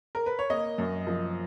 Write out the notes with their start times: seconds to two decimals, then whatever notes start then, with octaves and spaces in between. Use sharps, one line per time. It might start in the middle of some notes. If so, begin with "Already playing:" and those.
0.15 A#4
0.26 B4
0.39 C#5
0.50 A#3 D#5
0.78 F#2
1.07 F3